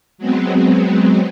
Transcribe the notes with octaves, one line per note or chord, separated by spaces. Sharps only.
F#3 G#3 B3 C4